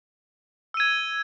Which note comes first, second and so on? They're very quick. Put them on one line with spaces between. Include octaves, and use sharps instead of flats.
E6 D#7 G#6